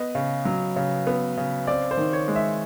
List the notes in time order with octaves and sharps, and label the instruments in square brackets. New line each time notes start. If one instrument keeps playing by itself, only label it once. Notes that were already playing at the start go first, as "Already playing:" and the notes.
Already playing: [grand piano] B3 D#5
C#3
F#3
C#3
B3
C#3
C4 D5
C5
D#3
C#5
G#3
E5